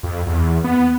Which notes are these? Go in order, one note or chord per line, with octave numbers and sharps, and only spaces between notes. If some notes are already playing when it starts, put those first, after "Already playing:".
F2
E2
B3